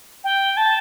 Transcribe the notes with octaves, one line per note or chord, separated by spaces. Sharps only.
G5
A5